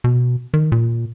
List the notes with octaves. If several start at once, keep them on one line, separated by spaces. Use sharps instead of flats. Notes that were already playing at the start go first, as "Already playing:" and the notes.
B2
D#3
A#2